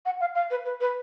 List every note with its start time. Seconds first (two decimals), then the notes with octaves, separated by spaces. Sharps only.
0.05 F#5
0.20 F5
0.35 F5
0.50 B4
0.65 B4
0.81 B4